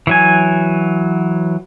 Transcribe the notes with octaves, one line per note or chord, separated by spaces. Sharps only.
E3 F#3 G#5